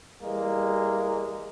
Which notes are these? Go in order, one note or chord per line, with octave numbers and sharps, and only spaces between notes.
E3 G3 G#3 A#3